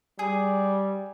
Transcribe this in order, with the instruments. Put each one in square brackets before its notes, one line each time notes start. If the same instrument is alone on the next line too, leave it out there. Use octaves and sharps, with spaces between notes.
[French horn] G3 [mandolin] G#4